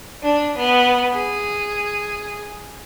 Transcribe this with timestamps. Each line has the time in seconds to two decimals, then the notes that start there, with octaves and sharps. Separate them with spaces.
0.23 D4
0.58 B3
1.13 G#4